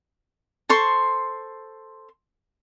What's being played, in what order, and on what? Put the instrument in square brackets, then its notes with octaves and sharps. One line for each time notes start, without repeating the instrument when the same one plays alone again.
[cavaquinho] A4 C5 C6 C#6